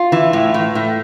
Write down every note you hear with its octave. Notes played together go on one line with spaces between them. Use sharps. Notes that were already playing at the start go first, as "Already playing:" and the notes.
Already playing: F4
E3
A2
A2
A2